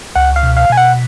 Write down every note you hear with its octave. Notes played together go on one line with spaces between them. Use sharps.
C#2 F#5
F5
B2
F5
B2 G#5
F#5